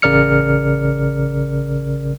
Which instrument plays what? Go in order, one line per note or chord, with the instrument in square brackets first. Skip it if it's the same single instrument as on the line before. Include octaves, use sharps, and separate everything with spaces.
[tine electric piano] A1 C#3 A#4 D5 F6 C#7